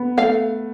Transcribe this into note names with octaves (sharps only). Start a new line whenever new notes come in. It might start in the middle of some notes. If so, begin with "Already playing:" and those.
Already playing: B3
A3 F5